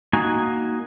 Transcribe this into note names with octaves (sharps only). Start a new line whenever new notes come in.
A#3 D#4 F#4 G#5